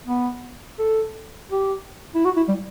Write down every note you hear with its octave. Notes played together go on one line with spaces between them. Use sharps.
B3
A4
G4
E4
F#4
E4
G3